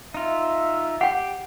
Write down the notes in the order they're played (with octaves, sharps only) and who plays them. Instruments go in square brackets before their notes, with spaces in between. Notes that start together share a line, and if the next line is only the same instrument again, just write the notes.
[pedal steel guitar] D#4 F4 [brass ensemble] E5
[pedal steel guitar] G4 [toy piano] F#5 G5